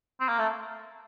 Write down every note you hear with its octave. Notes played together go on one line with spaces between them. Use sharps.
C4
A#3
A3